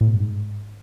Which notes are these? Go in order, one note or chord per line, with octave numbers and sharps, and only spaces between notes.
A2
B2
G2
G#2